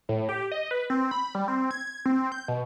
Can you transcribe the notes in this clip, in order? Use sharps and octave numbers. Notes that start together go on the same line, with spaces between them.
A2
G4
D#5
B4
C4
B5
G3
C4
G#6
C4
G6
B2